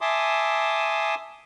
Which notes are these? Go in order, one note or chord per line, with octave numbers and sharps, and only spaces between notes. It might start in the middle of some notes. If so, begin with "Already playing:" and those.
E5 G#5 A5 C6 D6 D#6